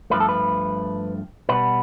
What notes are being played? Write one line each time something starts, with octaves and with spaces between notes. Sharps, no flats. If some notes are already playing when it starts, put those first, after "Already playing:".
G2 F3 A3 B4
A4
B4
B2 G3 B3 B4